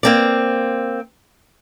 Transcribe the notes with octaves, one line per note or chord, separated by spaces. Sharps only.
A#3 C4 D5